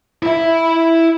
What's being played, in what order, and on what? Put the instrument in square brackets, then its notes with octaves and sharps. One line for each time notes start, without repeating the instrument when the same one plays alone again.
[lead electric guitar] E4 E5